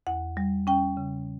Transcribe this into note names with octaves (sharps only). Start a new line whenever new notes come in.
E2 F#5
G3
C#4 G5
C#3